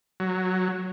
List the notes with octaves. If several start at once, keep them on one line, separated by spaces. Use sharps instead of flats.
F#3